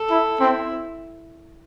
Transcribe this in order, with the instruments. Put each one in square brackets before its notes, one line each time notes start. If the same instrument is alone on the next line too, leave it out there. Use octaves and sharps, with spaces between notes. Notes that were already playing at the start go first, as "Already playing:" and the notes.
Already playing: [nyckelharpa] A4
[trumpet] E4
[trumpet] C4 [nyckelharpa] E4